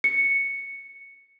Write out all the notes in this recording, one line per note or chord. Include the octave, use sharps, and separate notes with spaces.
C#7